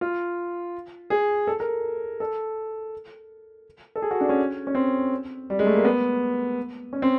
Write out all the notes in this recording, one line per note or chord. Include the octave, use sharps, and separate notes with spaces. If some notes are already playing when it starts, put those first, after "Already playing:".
F4
G#4
A4
A#4
A4
A4
G#4
F#4
D4
C#4
C#4
C4
G3
G#3
A3
A#3
B3
C#4
C4